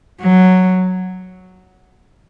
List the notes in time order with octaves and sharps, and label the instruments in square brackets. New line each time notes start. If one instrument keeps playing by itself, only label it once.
[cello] F#3